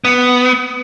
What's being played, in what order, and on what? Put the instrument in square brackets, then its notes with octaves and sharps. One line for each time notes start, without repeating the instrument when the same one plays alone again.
[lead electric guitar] B3